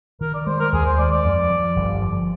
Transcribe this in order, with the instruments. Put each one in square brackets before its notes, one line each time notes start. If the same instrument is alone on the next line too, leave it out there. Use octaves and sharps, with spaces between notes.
[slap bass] D#3 [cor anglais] A#4
[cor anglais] D5
[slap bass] G#3 [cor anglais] C5
[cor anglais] A#4
[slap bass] D#2 [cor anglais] G#4
[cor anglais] C5
[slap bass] G#3 [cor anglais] D5
[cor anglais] D5
[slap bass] F2
F3
G1
F3